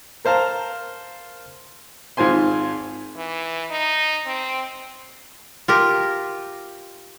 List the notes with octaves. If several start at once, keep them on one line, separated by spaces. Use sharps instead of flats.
A#4 C5 F5 A5 A#5
G#1 G#2 F4 C5 G#5 C6
E3
D#4
C4
F4 G4 A#4